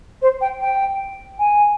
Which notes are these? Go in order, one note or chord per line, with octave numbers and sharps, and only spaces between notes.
C5
G5
G5
G#5